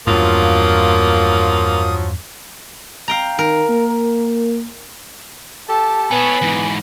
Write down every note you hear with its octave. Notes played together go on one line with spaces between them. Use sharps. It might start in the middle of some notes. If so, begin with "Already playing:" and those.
E2 G2 F3 F#3 A#3 F4 D#6
F5 G5 A#5
D#3 A#4
A#3
G4 A4 A5
B3 A4 C#5 G#5 B5
G#2 E3